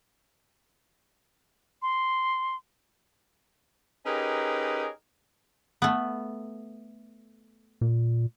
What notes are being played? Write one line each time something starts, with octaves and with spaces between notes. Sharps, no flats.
C6
C#4 D#4 G4 G#4 A#4 B4
A3 B3
A#2